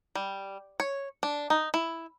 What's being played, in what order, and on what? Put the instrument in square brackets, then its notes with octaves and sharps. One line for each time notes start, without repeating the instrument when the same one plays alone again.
[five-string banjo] G3
C#5
D4
D#4
E4